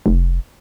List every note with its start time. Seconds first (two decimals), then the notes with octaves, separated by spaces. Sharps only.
0.06 F1